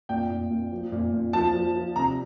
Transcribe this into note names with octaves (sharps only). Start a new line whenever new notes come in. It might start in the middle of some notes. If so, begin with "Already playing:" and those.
A#2 G5
A#2
A#2
F3
A#2
A#2
F3 A5
F3
F3
C3 A#5